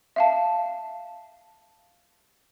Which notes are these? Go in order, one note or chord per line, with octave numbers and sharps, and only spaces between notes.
E5 F5 A5